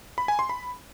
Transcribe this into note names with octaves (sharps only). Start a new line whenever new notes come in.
B5
G#5
C6
B5